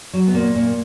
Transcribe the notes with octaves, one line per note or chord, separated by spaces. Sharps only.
F#3
B3
A#2 A#3
A#2